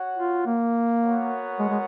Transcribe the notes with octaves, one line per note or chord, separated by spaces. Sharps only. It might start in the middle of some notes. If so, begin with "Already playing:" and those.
Already playing: F#4 C#5 F#5
F4
A#3
B3 F#4 A#4 C#5 F#5
G#3
G#3